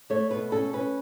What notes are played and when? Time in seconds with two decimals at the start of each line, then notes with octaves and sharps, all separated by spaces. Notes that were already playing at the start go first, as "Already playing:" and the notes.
0.10 A3 C#5
0.31 B2 B4
0.52 C#4 A4
0.73 C#4 B4